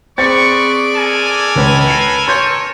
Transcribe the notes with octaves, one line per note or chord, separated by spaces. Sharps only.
C4 G#4 B4 D5 C#6 A6
A4 A#4 G#5
C#2 C#4 B4 C#5
C7 C#7
C#5 C6 G6 C#7